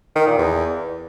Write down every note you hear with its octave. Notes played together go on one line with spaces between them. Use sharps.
D#3
A#2
E2